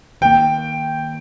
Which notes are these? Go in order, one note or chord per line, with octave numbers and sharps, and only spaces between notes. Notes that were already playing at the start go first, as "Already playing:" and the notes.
D#3 A#3 G5